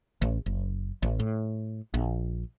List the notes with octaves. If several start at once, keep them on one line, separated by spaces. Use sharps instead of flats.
A1
F#1
A1
A2
A#1